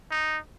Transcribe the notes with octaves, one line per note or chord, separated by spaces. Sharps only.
D#4